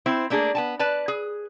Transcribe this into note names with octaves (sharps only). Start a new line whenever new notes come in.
C4 E4 C5
A3 A#3 D4 G#4
B3 G#5 A5
B4 D5 A5
G#4